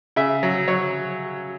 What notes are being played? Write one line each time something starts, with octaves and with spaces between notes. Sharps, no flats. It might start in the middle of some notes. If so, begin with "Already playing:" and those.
C#3 E5
F#3
F#3 C#5